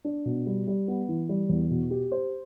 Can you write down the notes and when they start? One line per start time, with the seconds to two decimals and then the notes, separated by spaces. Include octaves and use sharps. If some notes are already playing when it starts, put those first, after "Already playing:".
0.05 D4
0.25 B2
0.46 G3
0.67 G3
0.88 B3
1.09 E3
1.29 G3
1.49 E2
1.70 B2
1.91 G4
2.12 C5